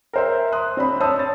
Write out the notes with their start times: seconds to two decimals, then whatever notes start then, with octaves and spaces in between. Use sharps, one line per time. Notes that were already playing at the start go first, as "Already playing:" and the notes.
0.13 A#4 C5 E5
0.52 C6 D#6 F#6
0.77 C4 D4 B5
1.00 C5 C#5 A5 D#6 E6
1.16 C#5 A6